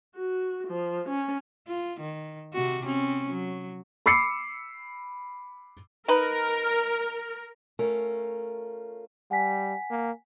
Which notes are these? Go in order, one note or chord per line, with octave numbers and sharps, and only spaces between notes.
F#4
F3
C#4
F4
D#3
C3 C4 F#4
C4 C#4
F#3
B5 D6 E6 C7 C#7
D#4 A#4 B4
A3 C#4 F4 A#4
G3 F#5 G#5 B6
A#3